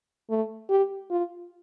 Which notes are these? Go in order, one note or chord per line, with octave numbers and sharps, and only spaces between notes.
A3
G4
F4